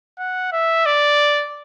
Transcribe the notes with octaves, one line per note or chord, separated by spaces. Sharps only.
F#5
E5
D5